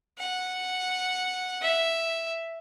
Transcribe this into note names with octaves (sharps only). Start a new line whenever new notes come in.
F#5
E5